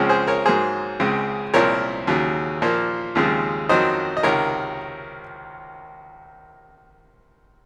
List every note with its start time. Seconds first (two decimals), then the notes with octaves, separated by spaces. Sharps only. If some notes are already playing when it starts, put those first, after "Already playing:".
Already playing: C#2 C#3 F3 G#3 C4 C#4
0.09 G#4 C5
0.27 A#4 C#5
0.45 G#2 F#3 A#3 G#4 C5
1.00 C#2 C#3 G#3 C4
1.54 C2 A#2 F3 C4 A#4 C#5
2.07 D#2 C#3 F#3
2.62 A#2 F3 A#3
3.15 D#2 C#3 F3 G#3 C4
3.69 F2 D#3 F#3 C4 C5 D#5
4.17 D#5
4.23 C#2 C3 D#3 A#4 C#5